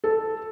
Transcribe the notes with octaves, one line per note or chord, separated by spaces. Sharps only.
A4